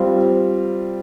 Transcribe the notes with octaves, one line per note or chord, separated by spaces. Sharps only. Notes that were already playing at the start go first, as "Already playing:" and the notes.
Already playing: G3 C4 F4